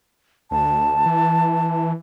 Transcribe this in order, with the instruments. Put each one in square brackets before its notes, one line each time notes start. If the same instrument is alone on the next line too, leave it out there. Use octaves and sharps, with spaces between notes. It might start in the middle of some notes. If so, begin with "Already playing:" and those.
[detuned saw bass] D2 [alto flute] A5
[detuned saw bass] E3